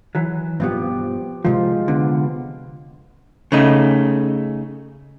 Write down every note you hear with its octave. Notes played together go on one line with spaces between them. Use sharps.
E3 F#3
G2 B2 F3 B3 C4 G4
C2 C3 F3 G#3 F4
D3 B3
C#3 A3 D#4